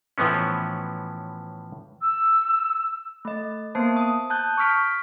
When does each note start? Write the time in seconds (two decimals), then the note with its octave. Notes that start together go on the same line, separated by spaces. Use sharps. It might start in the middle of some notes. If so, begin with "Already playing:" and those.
0.18 A2 E3 F3 B3 C#4
2.02 E6
3.25 A3 D#5
3.75 A#3 B3 C5 A5
3.97 D#6
4.30 A5 F#6 G6
4.58 C#6 D#6 F6 B6 D7